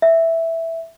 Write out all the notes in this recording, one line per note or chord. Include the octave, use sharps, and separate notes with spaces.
E5